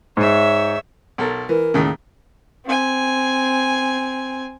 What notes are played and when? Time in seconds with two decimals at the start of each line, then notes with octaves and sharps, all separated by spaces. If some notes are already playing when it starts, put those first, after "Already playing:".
0.17 G#2 C#5 E5
1.18 B1 A4 A#4
1.49 E3 A#4
1.74 D#2 A2 C#3
2.66 C4 G#5